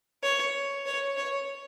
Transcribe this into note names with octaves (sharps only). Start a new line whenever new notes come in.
C#5
C#5
C#5